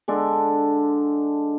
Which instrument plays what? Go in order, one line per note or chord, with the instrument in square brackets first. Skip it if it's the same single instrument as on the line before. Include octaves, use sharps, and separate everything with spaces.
[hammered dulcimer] D3 G#3 D4 A4